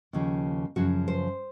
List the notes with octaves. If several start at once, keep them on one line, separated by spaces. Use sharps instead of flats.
D#2 C#3 F3
F#2 C#3 F3 F#4
C5